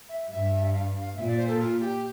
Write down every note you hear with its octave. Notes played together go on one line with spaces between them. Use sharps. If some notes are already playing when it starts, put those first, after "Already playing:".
E5
G2 E5
F5
F5
A#2 E5
D5
C5
A4
F4
G4